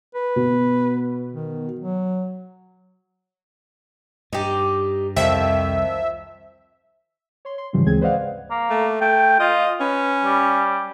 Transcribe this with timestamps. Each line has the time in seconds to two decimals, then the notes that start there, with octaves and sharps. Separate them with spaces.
0.15 B4
0.36 B2
1.33 D#3
1.80 F#3
4.33 G2 D#4 G4
5.16 C2 F2 D#3 F3 E5
7.45 C#5 C6
7.58 C6
7.73 G#2 C#3 E3 F3 G3 C#4
7.86 D2 C#3 G#3 C4 G#4 G#6
8.01 B4 C5 D5 D#5 F5 F#5
8.51 A#3
8.70 A3
9.01 A3 G5
9.40 F4 D#5
9.81 C#4 B4
10.24 G3